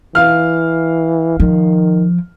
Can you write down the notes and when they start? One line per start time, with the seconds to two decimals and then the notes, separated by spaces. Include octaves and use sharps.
0.15 E3 F5 F6
1.40 D#3 F3